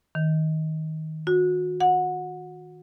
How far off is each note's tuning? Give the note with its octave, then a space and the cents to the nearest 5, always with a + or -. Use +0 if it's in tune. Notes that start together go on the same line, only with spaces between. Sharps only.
D#3 +15
F#4 -30
F#5 -20